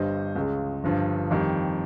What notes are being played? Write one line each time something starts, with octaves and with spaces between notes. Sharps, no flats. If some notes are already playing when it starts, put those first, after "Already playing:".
Already playing: G1 G2 G3 C5 D#5
C#2 C#3 G#3
G1 G2 F3
F2 D#3 G3